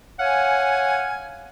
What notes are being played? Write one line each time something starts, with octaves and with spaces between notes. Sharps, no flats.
C#5 F5 F#5 G#5